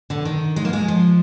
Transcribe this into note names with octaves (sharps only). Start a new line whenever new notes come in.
D3
D#3
G#3
A#3
G#3
F3